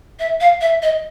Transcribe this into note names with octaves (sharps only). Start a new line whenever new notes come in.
E5
F5
E5
D#5